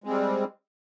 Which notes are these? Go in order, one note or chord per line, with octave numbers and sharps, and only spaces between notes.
G3 G#3 C4